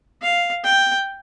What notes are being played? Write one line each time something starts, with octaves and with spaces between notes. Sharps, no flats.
F5
G5